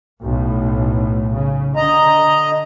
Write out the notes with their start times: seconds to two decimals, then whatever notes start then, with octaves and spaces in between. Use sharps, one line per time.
0.22 B1 A2
1.34 C#3
1.76 D3 D#5 A#5